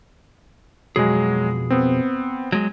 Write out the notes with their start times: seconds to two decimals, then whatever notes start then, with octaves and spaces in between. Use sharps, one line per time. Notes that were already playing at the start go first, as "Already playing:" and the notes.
0.96 F2 B2 F#3 G#3 G#4
1.70 B3 C4
2.52 F#3 G#3